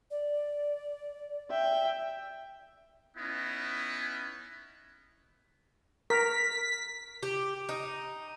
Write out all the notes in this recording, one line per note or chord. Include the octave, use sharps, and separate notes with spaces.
D5
E5 G5
B3 C#4 D#4 E4
A#4 B6
G4
D#4